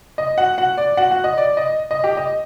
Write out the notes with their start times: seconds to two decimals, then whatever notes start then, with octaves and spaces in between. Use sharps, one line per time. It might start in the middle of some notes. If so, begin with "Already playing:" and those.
0.18 D#5
0.38 F#4 F#5
0.58 F#4 F#5
0.77 D5
0.97 F#4 F#5
1.11 F#4 F#5
1.24 D#5
1.38 D5
1.57 D#5
1.91 D#5
2.04 G4 G5
2.17 D#5